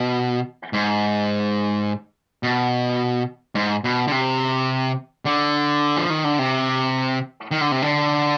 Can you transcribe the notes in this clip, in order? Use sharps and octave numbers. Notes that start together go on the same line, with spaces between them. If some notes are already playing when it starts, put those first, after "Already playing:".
Already playing: B2
G#2
B2
G#2
B2
D3
C3
D3
F3
D#3
D3
C3
D#3
D3
C3
D3